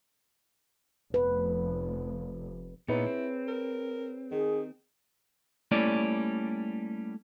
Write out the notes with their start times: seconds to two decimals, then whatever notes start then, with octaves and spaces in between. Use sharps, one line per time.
1.14 F1 B4
2.88 A#2 B3 D#4 E4 G#4 B4 C#5
3.06 C4
3.48 A#4
4.31 D#3 G#4
5.71 G3 A3 A#3 C#4 E4 D5